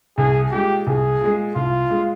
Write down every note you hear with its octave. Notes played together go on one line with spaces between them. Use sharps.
C2 G#4
A#2 G#3 G4
C2 G#4
A#2 G#3
C2 F4
A#2 G#3